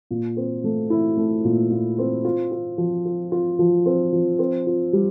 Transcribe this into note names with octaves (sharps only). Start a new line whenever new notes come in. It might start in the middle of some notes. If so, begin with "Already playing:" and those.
A#2
C4
A3
E4
A3
A#2
A#2
C4
F4
F4
F3
F4
F4
F3
C4
F3
C4
F4
G3